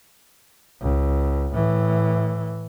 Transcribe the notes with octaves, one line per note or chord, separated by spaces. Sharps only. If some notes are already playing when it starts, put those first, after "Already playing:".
C#2
A2 E3